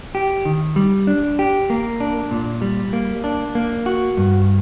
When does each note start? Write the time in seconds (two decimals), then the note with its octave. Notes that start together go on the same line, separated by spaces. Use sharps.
0.15 G4
0.45 D#3
0.76 G3
1.07 D4
1.39 G4
1.70 A#3
2.00 D4
2.31 A#2
2.62 G3
2.93 A#3
3.24 D4
3.55 A#3
3.86 F#4
4.17 G2